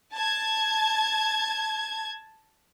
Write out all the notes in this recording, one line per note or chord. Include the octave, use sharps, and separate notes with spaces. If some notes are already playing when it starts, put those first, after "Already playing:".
A5 G#6